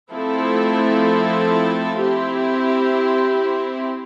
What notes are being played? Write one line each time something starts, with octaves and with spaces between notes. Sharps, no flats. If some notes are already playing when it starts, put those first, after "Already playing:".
F3 A3 C4 E4 A4
C4 E4 G4